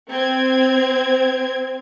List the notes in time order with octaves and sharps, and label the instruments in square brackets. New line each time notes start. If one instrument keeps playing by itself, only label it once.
[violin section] C4 G#6